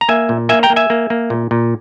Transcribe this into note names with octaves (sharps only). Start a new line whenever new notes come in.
A#5
A#3 E5 G#5
A#2
A#3 E5 G#5
G5 A#5
A#3
E5 G#5
A#3
A#3
A#2
A#2